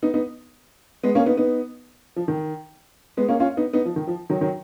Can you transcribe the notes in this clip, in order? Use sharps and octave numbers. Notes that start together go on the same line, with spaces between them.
B3 D#4
B3 D#4
G#3 B3
A#3 C#4
B3 D#4
B3 D#4
F3
D#3
G#3 B3
A#3 C#4
C#4 F4
B3 D#4
B3 D#4
F3
D#3
F3
D#3 F#3
D#3 F#3